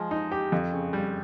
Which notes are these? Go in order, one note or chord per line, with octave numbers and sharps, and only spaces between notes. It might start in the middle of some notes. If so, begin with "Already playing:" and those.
Already playing: F3 G#3
D#4
G4
F2
C#3
G3